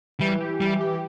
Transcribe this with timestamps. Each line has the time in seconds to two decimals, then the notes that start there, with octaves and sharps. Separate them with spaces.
0.20 E3 G3
0.40 G4
0.60 E3 G3
0.81 G4